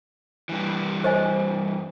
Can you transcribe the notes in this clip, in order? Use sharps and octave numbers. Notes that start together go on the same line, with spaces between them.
G2 E3
C5 D#5 G#5